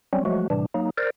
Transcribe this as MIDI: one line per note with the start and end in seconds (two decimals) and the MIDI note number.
0.13 0.24 54
0.13 0.24 55
0.13 0.24 60
0.13 0.24 61
0.25 0.48 53
0.25 0.48 54
0.25 0.48 56
0.25 0.48 57
0.25 0.48 66
0.50 0.66 45
0.50 0.66 48
0.50 0.66 52
0.50 0.66 55
0.50 0.66 62
0.74 0.90 54
0.74 0.90 58
0.74 0.90 63
0.97 1.10 70
0.97 1.10 72
0.97 1.10 74